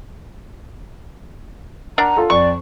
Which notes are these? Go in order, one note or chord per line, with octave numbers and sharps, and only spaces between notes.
D4 A#4 F#5 A#5
F4 A4
F2 D5 C#6